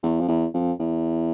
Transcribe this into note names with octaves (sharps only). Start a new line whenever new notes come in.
E2
F2
E2
F2
E2